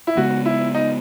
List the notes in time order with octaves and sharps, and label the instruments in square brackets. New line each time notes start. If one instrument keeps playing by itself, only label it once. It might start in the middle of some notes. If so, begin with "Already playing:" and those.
[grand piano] E4
[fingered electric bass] C#3 G#3 B3 [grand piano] F#4
[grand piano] E4
D#4